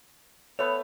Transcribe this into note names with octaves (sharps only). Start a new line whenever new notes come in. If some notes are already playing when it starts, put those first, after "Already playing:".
A3 B3 B4 C#5